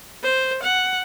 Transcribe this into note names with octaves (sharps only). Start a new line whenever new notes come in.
C5
F#5